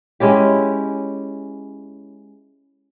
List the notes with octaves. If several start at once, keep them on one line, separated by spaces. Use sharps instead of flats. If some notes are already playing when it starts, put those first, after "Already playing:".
G#3 C#4 E4 G4